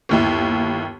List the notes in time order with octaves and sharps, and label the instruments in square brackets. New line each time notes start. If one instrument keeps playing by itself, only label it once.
[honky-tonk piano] G1 D#2 E4